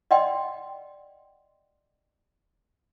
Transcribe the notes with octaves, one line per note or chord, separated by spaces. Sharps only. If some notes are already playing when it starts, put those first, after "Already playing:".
D5 D#5 F#5 G5 C6